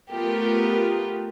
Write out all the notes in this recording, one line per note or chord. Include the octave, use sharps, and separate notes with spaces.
A3 B3 F4 G4 A#4